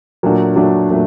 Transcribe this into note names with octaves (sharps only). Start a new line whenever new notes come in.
A#2 F#3 A3 D4 F#4
A#2 F#3 A3 D4 F#4
A#2 F#3 A3